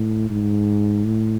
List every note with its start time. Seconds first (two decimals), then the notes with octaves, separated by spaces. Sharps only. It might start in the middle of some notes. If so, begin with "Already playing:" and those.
Already playing: A2
0.30 G#2
1.05 A2